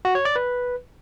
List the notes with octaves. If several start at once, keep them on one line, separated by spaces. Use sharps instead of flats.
F#4
C#5
D5
B4